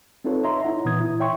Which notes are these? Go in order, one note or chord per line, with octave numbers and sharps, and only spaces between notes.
C4 D#4 F4 A4 B4 C#5
C#5 D#5 E5 A#5 C6
D#4 E4 F#5 A#5
A#2 E3 B3 B4 D#6 G#6
E4
C#5 E5 G5 C6 C#6